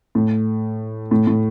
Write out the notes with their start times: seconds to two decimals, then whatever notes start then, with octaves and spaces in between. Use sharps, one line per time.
0.15 A2
1.11 A2
1.27 A2